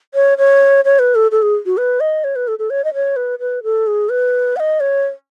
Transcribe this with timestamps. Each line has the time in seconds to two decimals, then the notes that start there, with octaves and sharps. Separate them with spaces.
0.14 C#5
0.38 C#5
0.85 C#5
0.99 B4
1.15 A4
1.31 A4
1.42 G#4
1.66 F#4
1.77 B4
2.00 D#5
2.24 C#5
2.36 B4
2.48 A4
2.59 A4
2.70 C#5
2.84 D#5
2.94 C#5
3.16 B4
3.40 B4
3.63 A4
3.87 G#4
4.09 B4
4.56 F#5
4.60 D#5
4.80 C#5